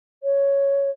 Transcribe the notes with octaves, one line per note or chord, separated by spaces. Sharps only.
C#5